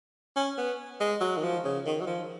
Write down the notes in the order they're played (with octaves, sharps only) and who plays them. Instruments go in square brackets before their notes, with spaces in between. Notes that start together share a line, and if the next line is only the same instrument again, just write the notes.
[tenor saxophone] C#4
B3
G#3
F#3
D#3
F3
C#3
D#3
F#3
F3